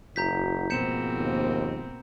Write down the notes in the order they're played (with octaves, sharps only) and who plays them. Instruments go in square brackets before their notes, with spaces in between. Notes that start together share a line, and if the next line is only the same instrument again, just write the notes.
[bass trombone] F#1 [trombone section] E4 F#4 [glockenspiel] A#5 G6 B6
[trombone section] G#2 F3 [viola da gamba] B2 A#3 C4 [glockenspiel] G6 C#7 E7
[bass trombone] D#2